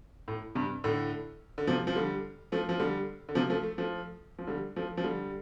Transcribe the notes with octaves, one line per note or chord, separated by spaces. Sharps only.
A2
G2 C3
A2 D3
D3
C3 F3
F3
D3 G3
F3 A3
F3
D3 G3
D3
C3 F3
F3 A3
A3
F3 A3
F3
D3 G3
F3 A3
F3
D3 G3